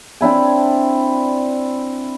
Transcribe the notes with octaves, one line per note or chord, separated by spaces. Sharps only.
C4 D4 E4 G#5